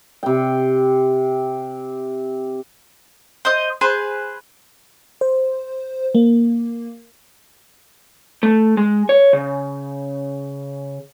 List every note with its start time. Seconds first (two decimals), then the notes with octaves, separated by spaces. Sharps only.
0.23 C3 G5
3.45 C5 D#5
3.81 G#4 B4 C5
5.21 C5
6.15 A#3
8.43 A3
8.77 G#3
9.09 C#5
9.33 C#3